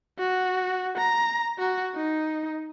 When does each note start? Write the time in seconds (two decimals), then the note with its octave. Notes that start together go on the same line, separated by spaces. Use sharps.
0.19 F#4
0.98 A#5
1.59 F#4
1.95 D#4